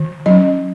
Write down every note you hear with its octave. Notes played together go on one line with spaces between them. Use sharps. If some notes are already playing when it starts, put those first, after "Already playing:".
Already playing: D#3
F#3 C#4 D#5